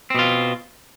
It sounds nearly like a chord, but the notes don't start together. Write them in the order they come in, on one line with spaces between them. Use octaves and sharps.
C4 B2 F4